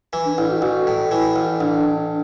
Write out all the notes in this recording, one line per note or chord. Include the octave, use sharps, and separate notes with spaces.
E3
D4
A1 E4
F#4
A1 F#4
A2
E3 E4
A1
A1 D4